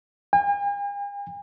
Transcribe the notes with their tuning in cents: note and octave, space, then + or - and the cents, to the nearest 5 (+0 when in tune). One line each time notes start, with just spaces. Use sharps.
G#5 -45